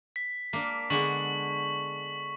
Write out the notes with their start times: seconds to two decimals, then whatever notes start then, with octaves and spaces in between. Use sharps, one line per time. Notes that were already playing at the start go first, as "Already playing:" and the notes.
0.16 B6
0.53 A#3 D4
0.90 D3 G#3 B3 C#6 B6 F#7